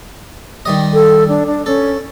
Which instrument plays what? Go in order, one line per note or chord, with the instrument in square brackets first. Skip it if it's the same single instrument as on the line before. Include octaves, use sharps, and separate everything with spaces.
[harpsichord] D#3 G3 D#5
[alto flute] A4
D4
D4
[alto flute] C#4 [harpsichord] A4